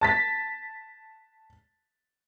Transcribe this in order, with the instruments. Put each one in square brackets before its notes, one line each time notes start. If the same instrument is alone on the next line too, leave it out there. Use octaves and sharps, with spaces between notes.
[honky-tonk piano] A5 A6 B6